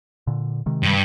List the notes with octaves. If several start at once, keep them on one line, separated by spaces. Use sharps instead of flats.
A#2 D3
C3 D#3 G#3
G2